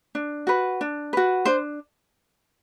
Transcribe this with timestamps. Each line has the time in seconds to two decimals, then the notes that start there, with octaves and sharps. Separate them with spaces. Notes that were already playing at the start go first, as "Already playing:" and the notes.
0.15 D4
0.47 F#4 B4
0.81 D4
1.13 F#4 B4
1.45 D4 C5